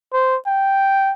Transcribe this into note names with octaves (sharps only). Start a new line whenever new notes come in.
C5
G5